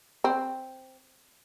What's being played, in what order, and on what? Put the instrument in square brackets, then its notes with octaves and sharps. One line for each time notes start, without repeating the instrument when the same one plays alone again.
[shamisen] C4